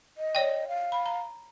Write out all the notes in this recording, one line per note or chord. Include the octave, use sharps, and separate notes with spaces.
D#5
C#5 D5 G5
F5
B5
A#5